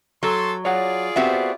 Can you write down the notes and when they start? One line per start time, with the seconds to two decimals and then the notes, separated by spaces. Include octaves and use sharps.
0.23 F#3 A4 C6
0.65 F4 G#4 C#5 D5 F#5
1.16 B3 C4 F#4 G4 C5 E5